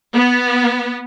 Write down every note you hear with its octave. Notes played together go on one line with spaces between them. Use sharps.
B3